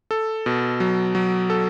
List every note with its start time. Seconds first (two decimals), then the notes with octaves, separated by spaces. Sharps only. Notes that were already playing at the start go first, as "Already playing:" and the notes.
0.11 A4
0.46 B2
0.80 F#3
1.15 F#3
1.50 A4